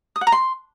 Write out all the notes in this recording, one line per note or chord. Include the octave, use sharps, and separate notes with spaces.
D#6
F#5
A#5
C6